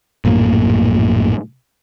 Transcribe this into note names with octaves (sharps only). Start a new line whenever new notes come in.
A#1 F#2 A2 A#3